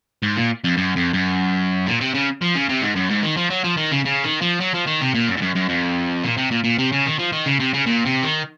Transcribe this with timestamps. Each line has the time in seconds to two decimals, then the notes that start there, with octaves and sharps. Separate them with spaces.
0.23 G#2
0.36 A#2
0.64 F2
0.77 F#2
0.96 F2
1.13 F#2
1.87 A#2
2.01 C3
2.14 C#3
2.41 F3
2.55 C#3
2.69 C3
2.82 G#2
2.96 F#2
3.10 G#2
3.23 D#3
3.37 F3
3.50 F#3
3.64 F3
3.77 D#3
3.92 C#3
4.05 C#3
4.24 D#3
4.41 F3
4.60 F#3
4.74 F3
4.86 D#3
5.01 C3
5.14 A#2
5.27 F#2
5.37 G#2
5.41 F#2
5.55 F#2
5.69 F2
6.24 A#2
6.37 C3
6.51 A#2
6.64 A#2
6.79 C3
6.92 C#3
7.06 D#3
7.19 F3
7.32 D#3
7.46 C#3
7.60 C3
7.74 C#3
7.87 A#2
8.06 C3
8.24 D#3